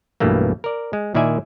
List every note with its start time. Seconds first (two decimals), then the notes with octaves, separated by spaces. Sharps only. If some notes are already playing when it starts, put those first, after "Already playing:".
0.20 B1 G2 B2 E3 A3 A#3
0.64 A#4 D5
0.93 G#3
1.15 A#2 D#3 E4 D5 E5 G#5